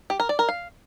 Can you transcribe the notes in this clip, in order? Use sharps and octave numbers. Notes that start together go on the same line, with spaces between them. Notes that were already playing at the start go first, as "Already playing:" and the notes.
G4
A#4
D5
A#4
F5